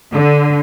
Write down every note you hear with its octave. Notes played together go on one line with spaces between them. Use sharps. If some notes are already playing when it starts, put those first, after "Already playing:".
D3